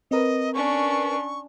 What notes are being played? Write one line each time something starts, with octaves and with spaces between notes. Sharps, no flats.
C4 A#4 B4 D#5
C#4 D4 C#6